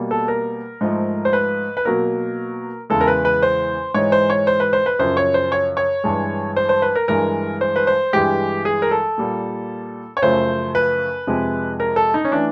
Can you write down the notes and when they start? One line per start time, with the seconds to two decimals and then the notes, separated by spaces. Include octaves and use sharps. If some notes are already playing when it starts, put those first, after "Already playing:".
Already playing: B2 G3 A#3
0.11 A4
0.28 A#4
0.81 G#2 F3 A3
1.25 C5
1.33 B4
1.77 B4
1.85 B2 F#3 A#3 A#4
2.90 E2 C#3 E3 G#3 A4
3.01 A#4
3.07 B4
3.25 B4
3.43 C5
3.94 G#2 E3 G#3 C#5
4.12 C5
4.30 C#5
4.47 C5
4.60 B4
4.73 C5
4.86 B4
4.99 F#2 C#3 F3 C5
5.17 C#5
5.34 C5
5.52 C#5
5.77 C#5
6.04 G2 E3 G#3
6.56 C5
6.69 C5
6.82 B4
6.95 A#4
7.08 G2 E3 G#3 A#4
7.61 C5
7.76 B4
7.87 C5
8.13 G2 E3 G#3 G4
8.65 G#4
8.82 A#4
8.91 A4
9.18 A#2 G3 A#3
10.17 C#5
10.22 F#2 C#3 F3 A3 C5
10.75 B4
11.27 F2 C3 F3 G#3
11.80 A#4
11.96 A4
12.14 D#4
12.25 C#4
12.32 E3 A3 D4